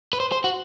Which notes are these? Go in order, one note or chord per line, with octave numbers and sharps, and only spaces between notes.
B4
C5
C5
F#4